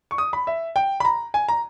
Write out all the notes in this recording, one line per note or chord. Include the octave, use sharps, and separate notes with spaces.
C#6
D#6
B5
E5
G5
B5
A#5
G#5
A#5